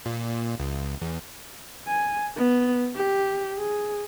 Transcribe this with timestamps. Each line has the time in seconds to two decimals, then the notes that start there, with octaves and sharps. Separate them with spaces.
0.06 A#2
0.60 C#2
1.02 E2
1.87 G#5
2.36 B3
2.95 G4
3.58 G#4